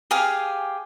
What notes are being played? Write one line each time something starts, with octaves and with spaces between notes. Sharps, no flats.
G4 G#4 F5 G#5